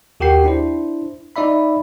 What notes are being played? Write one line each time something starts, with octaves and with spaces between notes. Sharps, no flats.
D#2 F#4 G4 A#4 G5 C7
D4 E4 C5
D#4 D5 E5 B5